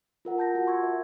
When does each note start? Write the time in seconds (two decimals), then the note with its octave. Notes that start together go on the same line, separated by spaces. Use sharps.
0.25 F4 A#4 F#5
0.38 A5 G6 A#6
0.55 F4 F#4 F#5 A5
0.67 C6 C#6 E6 G#6
0.83 A#4 E5